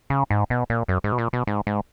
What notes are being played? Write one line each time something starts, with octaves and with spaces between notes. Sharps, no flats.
C#3
G#2
B2
A#2
F#2
G#2
B2
A#2
B2
G#2
G#2